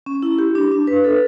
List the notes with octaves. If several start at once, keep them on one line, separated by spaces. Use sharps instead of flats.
C#4
E4
G4
D4
D4
B4
A4